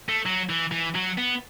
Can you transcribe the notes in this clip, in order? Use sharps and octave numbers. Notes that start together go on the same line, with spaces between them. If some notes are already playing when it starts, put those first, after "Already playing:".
A3
F#3
E3
E3
F#3
B3